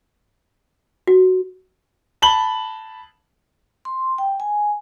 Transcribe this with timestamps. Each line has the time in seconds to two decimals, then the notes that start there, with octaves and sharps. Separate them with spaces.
1.07 F#4
2.22 A5 B5 F#7 G7
3.85 C6
4.18 G5
4.40 G#5